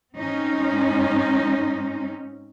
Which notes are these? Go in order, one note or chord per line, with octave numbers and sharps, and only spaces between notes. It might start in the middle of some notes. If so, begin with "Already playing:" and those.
G#2 C4 C#4 D#4